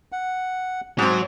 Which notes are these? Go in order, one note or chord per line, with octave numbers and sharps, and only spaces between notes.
F#5
G#2 F#3 C4